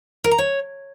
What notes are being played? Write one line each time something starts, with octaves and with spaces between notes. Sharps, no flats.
A#4
A#5
C#5